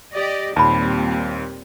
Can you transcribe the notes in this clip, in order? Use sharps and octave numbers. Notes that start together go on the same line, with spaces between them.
G4 D5 D#5
D#2 A#2 G3 C4 A5 B5